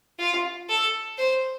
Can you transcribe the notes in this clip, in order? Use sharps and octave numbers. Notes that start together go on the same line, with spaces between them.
F4
A4
C5